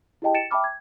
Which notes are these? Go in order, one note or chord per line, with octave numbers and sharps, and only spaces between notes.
E4 G4 G#4 D#5 G5 A5
A6 C#7 D7 E7
E5 G5 A5 B5 D6 F6
G#6